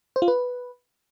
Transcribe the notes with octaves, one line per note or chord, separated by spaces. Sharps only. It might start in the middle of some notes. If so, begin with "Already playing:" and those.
C5
F4
B4